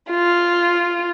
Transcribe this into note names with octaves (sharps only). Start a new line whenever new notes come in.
F4